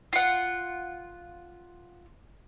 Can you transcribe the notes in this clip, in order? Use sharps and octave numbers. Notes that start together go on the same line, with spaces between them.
F4 F#5